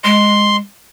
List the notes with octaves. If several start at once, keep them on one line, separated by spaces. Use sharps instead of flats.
G#3 C6